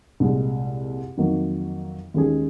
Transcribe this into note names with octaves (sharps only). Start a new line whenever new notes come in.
C2 A#2 G#3
F2 D#3 F#3 A#3
D#2 D#3 G#3 C#4 G#4